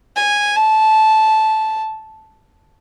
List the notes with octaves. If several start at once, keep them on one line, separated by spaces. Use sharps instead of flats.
G#5
A5